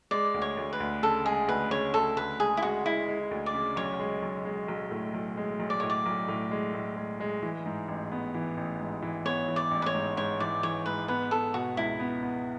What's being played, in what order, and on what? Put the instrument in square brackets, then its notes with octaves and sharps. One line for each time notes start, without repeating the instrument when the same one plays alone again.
[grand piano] G#3 [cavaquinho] D5
[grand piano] D2
[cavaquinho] C#5
[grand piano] D2
[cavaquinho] B4
[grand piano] D2
[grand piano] C#3 [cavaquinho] A4
[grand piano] G#3 [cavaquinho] G#4
[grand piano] D2 [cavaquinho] B4
[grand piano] C#3 [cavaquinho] C#5
[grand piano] D2 [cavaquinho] A4
[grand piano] D2 [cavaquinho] B4
[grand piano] G#3 [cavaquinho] G#4
[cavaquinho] E4
[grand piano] G#3 [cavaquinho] F#4
[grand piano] G#3 [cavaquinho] E4
[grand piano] G#3
D2
[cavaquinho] D5
[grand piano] C#3
[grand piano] B1 [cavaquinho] C#5
[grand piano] G#3
B1
G#3
B1
A2
B1
G#3
B1
[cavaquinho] D5
[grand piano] A2 [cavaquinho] C#5
[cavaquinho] D5
[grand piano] B1
A2
G#3
A2
G#3
G#3
E3
G#2
A1
B3
E3
A1
G#2
E3
[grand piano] B3 [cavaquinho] C#5
[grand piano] E3
[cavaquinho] D5
[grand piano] A1
[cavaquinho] B4
C#5
[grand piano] G#2
[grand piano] G#2 [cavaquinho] C#5
[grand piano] E3 [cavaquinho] D5
[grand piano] E3 [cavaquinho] C#5
[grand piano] G#2 [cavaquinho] B4
[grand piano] B3 [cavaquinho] B4
[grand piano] B3 [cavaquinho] A4
[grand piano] B2 [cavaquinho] F#4
[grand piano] C#2 [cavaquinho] E4
[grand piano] B3
B3